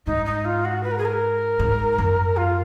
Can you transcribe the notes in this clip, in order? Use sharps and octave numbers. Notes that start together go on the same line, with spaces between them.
G#2 D#4
D#4
F4
F#4
B4
A#4
G#4
A#4
G#2
F#2
F4